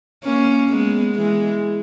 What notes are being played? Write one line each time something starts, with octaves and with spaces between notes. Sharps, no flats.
A#3 C#4
G#3 B3
E3 G#3